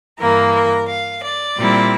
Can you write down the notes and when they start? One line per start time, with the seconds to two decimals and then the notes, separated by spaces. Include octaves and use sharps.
0.20 G2 E3 A#3 A#4
0.54 A#4
0.89 F5
1.23 D5
1.56 A#2 G3 C4 E4